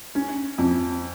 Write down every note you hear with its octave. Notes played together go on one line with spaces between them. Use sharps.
C#4
F2